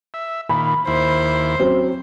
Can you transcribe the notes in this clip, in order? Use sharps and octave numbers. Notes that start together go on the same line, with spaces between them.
E5
A#2 D#3 B5
D#2 E4 C5
F#3 C4 C#4